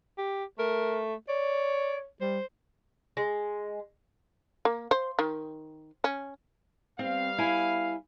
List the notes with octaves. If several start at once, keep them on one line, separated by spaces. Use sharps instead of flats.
G4
A3 A#4
C#5 D5
G3 C5
G#3
A#3
C5
D#3
C#4
G3 B3 C4 F5
E4 G#5